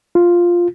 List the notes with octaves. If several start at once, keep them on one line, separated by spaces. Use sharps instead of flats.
F4